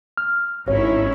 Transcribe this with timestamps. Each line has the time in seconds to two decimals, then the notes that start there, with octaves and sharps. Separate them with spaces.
0.17 F6
0.68 G#1 C#4 D#4 E4 C#5